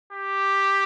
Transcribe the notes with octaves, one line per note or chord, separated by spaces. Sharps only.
G4